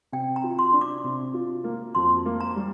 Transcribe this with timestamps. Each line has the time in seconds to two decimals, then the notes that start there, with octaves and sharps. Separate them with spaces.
0.12 C3 G5
0.36 A#5
0.44 F4
0.59 C6
0.73 D4
0.81 D6
1.04 C3
1.34 F4
1.64 A#3
1.95 F2 C6
2.26 A#3
2.40 A#5
2.56 G3